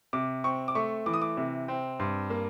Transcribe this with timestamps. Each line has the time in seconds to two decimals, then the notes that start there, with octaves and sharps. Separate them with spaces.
0.13 C3 D6
0.44 C4 C#6
0.68 D6
0.75 A3 C#6
1.06 E3 D6
1.13 D#6
1.22 D6
1.37 C3
1.68 C4
1.99 G2 C6
2.30 A#3